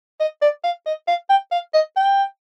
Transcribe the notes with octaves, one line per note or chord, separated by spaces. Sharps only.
D#5
D5
F5
D#5
F5
G5
F5
D#5
G5